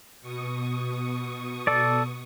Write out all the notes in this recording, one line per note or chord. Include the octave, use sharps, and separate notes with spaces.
B2 C#6 D#6
A4 D5